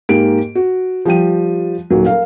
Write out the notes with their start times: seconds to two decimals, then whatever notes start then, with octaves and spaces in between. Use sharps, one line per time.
0.09 G#2 A#3 G4 D7
0.55 F#4
1.05 F3 G3 G5 D#7
1.90 D#1 F#3 A#3
2.06 A#4 F5